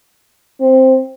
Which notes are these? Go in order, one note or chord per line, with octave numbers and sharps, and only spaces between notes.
C4